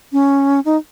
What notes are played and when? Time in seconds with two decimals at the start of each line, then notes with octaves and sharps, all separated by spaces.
0.12 C#4
0.65 D#4